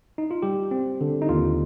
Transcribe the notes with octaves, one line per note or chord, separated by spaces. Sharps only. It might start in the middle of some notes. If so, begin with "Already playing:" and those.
D#4
F4
G3 G4
C4
D3
D#4
D#2 F4